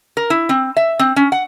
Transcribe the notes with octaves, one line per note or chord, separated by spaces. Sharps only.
A#4
E4
C4
E5
C4
C#4
F#5